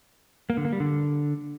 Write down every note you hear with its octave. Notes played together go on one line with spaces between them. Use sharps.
A#3
D3
A#3
G3
D3